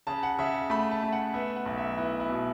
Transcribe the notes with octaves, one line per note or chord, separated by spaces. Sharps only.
C#3 A5
F#5
C#3 E5
F#5
A3 B5
A5
A3
F#5
B3 E5
F#5
B1
E5
B3 E4
E4
B2